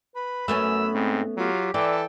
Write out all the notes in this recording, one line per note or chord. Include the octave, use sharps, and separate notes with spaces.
B4 B5
F#2 A3 B3 C#4 E6
G#2 C4
F#3 F4 G4
E3 A4 D5 G5